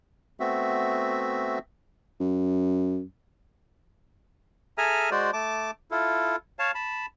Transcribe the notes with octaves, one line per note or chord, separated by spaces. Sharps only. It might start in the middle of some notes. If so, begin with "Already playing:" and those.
A3 B3 C4 F#4 E5
F#2
G#4 A4 E5 G#5 A#5 F6
G#3 F#4 C5 D5
A3 A5 D6
E4 F4 A4
C#5 F5 A5
A5 B5